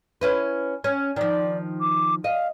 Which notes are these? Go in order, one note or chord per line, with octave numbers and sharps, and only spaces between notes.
C#4 E4 B4
C#4
D#3 F3 D5
D6
D#5 F5